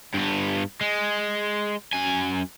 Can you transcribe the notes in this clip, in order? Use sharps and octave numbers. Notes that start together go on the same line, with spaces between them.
G2 B3
G#3
F#2 G#5